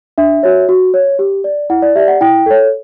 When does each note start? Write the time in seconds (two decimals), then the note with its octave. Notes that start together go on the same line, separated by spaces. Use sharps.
0.18 D4 E5
0.43 F#4 C#5
0.69 F#4
0.94 C#5
1.19 G4
1.44 D5
1.70 E4 F#5
1.82 D5
1.96 G4 E5
1.99 D5
2.08 F#5
2.21 E4 G5
2.46 A4 C#5